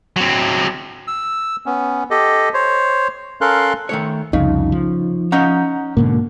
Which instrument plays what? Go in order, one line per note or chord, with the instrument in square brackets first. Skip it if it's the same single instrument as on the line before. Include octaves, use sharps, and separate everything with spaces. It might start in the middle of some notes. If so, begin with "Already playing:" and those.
[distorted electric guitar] F#3 C4
[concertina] E6
B3 C#4
G4 A4 D#5
C5 C#5
C#4 A4 A#4 F5 C6 F#6
[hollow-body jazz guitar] D#3 A3 C#5
[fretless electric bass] C2 F2 [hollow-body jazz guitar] C#3 [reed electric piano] D#4
[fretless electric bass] F3
[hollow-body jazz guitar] C#4 D#4 F5 [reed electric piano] F#5 A#5 G6
[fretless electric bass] G#2 B2 D3 [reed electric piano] A#3